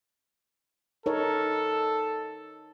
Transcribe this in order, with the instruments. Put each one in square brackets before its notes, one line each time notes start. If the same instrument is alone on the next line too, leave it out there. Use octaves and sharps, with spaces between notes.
[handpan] D#4 A#4 C#5 [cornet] A4